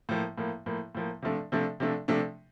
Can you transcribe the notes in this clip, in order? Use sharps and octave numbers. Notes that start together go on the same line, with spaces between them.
A2 F3 A#3
A2 F3 A#3
A2 F3 A#3
A2 F3 A#3
C3 F3 A3 D4
C3 F3 A3 D4
C3 F3 A3 D4
C3 F3 A3 D4